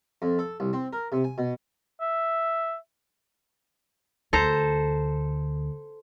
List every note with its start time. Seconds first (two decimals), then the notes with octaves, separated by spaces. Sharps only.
0.22 F2
0.39 A4
0.60 C2
0.73 C4
0.93 A#4
1.12 C3
1.24 G#5
1.38 B2
2.01 E5
4.33 D2 A4 C5 A#5